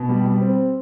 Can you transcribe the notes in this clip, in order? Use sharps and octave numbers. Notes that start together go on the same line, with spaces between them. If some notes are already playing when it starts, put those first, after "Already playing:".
Already playing: B2
G3
G3
C4